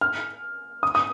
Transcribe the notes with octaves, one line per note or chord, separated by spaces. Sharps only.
F6
D#6
D#6